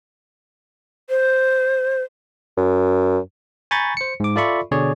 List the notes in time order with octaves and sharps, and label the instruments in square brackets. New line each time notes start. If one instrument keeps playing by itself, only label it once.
[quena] C5
[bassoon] F#2
[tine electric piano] G#5 A#5 B5 C#6 G6 A6
C5 C#7
G#2 D6
F4 A4 D5 E5 B5 C#6
B2 D3 G#4 C#5 D5